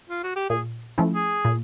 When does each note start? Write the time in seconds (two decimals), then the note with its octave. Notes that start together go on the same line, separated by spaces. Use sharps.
0.09 F4
0.24 F#4
0.36 G4
0.50 A#2 G#4
0.98 F3 A3 C#4 E4
1.14 G#4
1.45 A#2